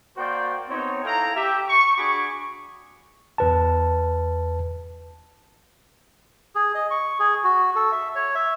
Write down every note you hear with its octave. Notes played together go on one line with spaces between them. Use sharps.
A#3 F#4 A#4 C5 D5 G5
B3 C4 D#4 C#5
E4 A4 F5 G5 A#5
G4 E5
C#6
D4 F#4 G#4 B5 C#6 D6
E2 B4 A5
G#4
D#5
C#6
G#4
F#4
A4
E5
C#5
E5